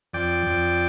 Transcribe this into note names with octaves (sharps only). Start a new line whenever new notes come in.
F2 D5 G5
F2